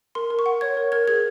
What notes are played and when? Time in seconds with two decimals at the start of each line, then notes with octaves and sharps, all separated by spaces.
0.15 A#4 C6
0.30 A#4
0.39 C#6
0.46 F#5
0.61 C#5 G#6
0.77 A#4
0.92 A#4 G#6
1.08 G#4 G#6